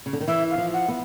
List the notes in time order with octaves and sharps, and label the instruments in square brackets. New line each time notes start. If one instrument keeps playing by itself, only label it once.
[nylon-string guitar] C#3
D3
D#3
[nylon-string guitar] E3 [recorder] E5
[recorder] F5
[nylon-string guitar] F3
[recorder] F#5
[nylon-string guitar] B3